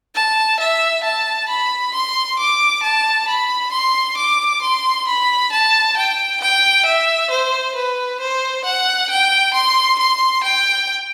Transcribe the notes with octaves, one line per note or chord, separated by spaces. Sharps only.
A5
E5
A5
B5
C6
D6
A5
B5
C6
D6
C6
B5
A5
G5
G5
E5
C5
B4
C5
F#5
G5
C6
C6
G5